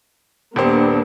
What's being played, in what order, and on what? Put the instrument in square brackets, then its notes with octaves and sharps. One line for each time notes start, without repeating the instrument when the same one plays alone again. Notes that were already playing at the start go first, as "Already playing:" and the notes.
[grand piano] D#1 G4 C5 [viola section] A#3 B3 D4